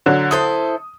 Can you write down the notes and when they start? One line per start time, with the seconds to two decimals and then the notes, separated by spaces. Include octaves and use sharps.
0.06 D3 F#3
0.31 E4 A4 C5 D#6